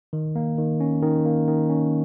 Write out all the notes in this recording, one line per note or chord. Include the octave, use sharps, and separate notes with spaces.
D#3
A#3
D#3
C#4
D#3
A#3
D#3
C#4